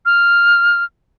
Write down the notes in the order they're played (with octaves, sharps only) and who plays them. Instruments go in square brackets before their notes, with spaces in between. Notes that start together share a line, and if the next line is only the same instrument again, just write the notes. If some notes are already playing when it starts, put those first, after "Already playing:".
[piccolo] F6